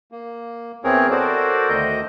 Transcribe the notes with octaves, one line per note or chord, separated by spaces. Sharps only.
A#3
E2 E3 C4 G#4 A#4 C#5
F#4 A4 A#4 C5 D5
D2 D#3 D#5 G6